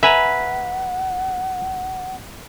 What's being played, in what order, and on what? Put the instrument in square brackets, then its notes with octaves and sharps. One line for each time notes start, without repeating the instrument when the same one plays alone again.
[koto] B4 [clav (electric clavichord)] E5 G#5 A#5 [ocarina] F#5